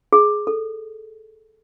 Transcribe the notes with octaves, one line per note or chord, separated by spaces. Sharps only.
G#4
A4